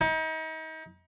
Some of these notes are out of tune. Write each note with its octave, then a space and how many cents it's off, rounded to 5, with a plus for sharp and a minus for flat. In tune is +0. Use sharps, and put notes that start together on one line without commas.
D#4 +35